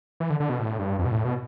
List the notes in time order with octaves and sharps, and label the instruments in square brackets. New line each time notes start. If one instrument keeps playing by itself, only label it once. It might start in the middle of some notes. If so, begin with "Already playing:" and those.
[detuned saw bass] E3
D3
D3
B2
A2
G2
F2
B2
A2
B2